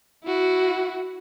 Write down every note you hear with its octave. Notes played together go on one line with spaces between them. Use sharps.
E4 F#4